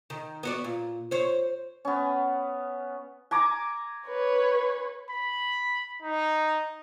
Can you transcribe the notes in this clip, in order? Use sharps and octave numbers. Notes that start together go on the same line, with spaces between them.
D#3
B3 F#4 D5
A#2
C5 C#5
B3 C#4
G#5 A#5 D6
B4 C#5
B5
D#4